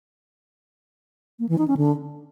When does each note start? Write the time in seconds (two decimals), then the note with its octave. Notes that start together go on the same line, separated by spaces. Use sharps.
1.39 A#3
1.49 E3
1.58 D#4
1.68 C#4
1.77 D3